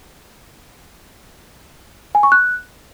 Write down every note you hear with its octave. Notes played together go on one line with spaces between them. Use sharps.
G#5
C#6
F#6